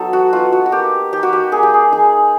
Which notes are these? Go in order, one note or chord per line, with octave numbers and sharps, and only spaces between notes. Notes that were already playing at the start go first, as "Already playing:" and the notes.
Already playing: F#3 B3 D#4 A4
F#4
B3 D#4 F4
F#4
F#4
A#3 G4
D#4 G4
F#4
G4
A#3 G#4
G4
G#4
D#4 G#4